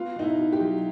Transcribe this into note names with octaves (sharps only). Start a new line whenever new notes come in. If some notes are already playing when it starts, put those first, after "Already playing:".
Already playing: B3 F4
B2 D#4
E4
B2
G4
F#3